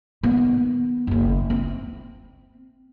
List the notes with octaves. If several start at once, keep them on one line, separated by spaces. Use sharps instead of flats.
D#3 B3
F#1 D#2
C4